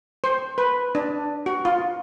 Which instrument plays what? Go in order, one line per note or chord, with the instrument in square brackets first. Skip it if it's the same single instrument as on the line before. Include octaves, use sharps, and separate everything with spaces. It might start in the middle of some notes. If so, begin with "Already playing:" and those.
[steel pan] C5
B4
D4
F#4
F4